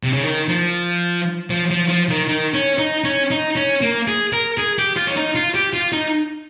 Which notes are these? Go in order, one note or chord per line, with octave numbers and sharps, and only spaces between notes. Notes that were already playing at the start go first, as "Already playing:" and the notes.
C3
C#3
D#3
F3
F3
F3
F3
D#3
D#3
C#4
D#4
C#4
D#4
C#4
A#3
G#4
A#4
G#4
G4
F4
C#4
D#4
F4
G4
F4
D#4